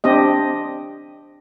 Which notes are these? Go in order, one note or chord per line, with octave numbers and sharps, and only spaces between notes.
C4 D4 G4 D#5